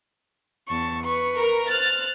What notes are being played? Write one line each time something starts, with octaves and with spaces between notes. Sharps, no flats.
E2 A5 C#6
B4 C#6
A#4
C5 F6 F#6 A6